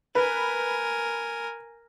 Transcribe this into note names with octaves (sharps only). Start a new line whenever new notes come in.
A#4 B4 G#5